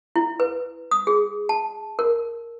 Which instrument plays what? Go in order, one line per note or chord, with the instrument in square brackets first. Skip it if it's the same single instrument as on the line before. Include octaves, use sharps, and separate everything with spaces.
[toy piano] E4
B4
D#6
G#4
A5
A#4